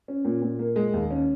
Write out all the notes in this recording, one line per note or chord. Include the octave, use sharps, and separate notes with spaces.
C#4
A#2
A#2
A#3
G#3
D#2
C#4